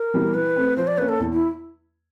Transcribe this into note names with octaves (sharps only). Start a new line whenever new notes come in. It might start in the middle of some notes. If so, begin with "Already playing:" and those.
Already playing: A#4
E3 G3 B3
E3 B4
A3 C4
F3 C5
D5
A#3 C#4 B4
A4
E2
E4